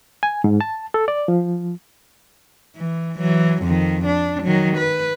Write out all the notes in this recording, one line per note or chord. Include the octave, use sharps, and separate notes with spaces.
G#5
G#2
A5
A4
D5
F3
E3
E3 F#3
F2 D#3
D4
D#3 F#3
B4